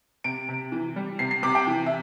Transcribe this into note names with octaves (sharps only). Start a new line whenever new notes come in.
C3 D7
C3
E3
G3
C3 C7
C7
C3 D6
G5
E3
E5